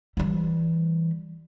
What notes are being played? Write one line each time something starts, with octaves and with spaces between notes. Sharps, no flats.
E3 G3